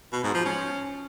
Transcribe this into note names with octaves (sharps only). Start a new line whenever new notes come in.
B2
G#2
F3
C#4